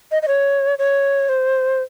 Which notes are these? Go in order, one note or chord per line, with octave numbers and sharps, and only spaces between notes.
D#5
D#5
C#5
C#5
C5